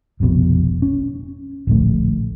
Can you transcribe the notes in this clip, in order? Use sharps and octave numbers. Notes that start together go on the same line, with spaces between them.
F1 A#1 F2 B2
C#4
D1 A#1 A3